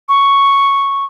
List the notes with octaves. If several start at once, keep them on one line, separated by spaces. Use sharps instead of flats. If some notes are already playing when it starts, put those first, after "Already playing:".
C#6